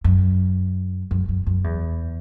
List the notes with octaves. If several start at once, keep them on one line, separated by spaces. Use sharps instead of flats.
F#2
F#2
F#2
F#2
E2